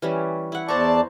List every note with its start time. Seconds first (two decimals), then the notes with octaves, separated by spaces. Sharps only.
0.02 E3 G3 C#4
0.52 E4 F#5
0.68 E2 C5 D5 A5 A#5 C#6